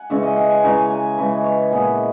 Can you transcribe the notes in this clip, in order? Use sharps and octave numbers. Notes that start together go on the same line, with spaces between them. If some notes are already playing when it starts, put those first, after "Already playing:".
Already playing: F#5 G#5
C#3 E3 G#3 C#4 E5
D#5
F#5
G#5
C#3 E3 G#3 C#4 A#5
G#5
C#3 E3 G#3 C#4 B4
C#5
A#2 G#3 B3 E4 B5